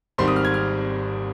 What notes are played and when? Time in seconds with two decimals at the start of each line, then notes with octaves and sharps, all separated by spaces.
0.18 G#1 G#2 D#3 G3 C4 C6
0.28 D#6
0.36 F6
0.45 G#6
0.54 F6